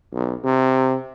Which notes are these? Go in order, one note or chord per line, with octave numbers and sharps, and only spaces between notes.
B1
C3